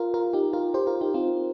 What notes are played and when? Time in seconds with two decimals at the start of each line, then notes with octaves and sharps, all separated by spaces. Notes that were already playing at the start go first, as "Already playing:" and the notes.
Already playing: F4 A#4
0.14 F4 A#4
0.33 D#4 G4
0.53 F4 A#4
0.74 G4 C5
0.87 F4 A#4
1.01 D#4 G4
1.14 C4 F4